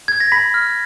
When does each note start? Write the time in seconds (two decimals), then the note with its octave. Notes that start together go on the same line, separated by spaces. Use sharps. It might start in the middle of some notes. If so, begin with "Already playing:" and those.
0.08 G#6
0.20 A#6
0.32 B5 B6
0.54 F6